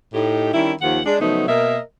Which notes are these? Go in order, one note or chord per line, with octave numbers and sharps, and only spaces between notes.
A2 D#4 G4
D#3 G3 C#4 D4 E4
D#2 F3 F#5
G#3 D4
C#3 F3 F#3 A3 B3 D#4
B2 A#3 A#4 D#5 E5